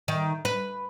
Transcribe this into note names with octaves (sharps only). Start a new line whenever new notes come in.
D#3
B4